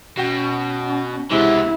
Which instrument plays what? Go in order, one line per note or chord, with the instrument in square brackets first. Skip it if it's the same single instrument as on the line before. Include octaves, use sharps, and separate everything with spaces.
[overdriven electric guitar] B2 [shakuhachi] C#4 [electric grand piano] F#4 F#5 G5
[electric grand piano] C#2 C3 G#3 [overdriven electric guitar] E3 B3 [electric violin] E4